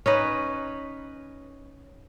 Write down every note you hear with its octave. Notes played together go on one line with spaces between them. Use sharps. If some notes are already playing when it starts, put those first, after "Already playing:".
C#4 D#4 B4